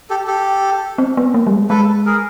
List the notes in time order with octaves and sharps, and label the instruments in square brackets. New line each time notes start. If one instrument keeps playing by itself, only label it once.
[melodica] G4 A4
G4 A4
[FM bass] C4
B3
A#3
G3
G#3
[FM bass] G#3 [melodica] A4 B4
[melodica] G#4 A#4